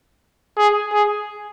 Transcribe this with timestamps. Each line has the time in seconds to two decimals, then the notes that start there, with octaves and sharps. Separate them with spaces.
0.58 G#4
0.93 G#4